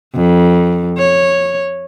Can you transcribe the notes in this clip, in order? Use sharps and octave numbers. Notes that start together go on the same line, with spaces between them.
F2
C#5